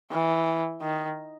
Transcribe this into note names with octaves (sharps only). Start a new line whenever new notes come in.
E3
D#3